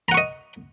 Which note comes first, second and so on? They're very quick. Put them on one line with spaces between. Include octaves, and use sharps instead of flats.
A#5 F#5 C#6 D#5